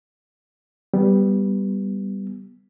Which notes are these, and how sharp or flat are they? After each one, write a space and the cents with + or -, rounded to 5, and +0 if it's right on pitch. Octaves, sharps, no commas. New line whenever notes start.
G3 +0 B3 +0